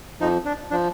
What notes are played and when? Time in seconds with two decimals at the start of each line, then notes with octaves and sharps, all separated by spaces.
0.20 F2 F3 D#4
0.45 D4
0.71 F3 D4